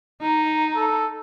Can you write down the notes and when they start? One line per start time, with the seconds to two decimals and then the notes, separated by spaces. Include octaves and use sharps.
0.22 D#4 A#5
0.76 A4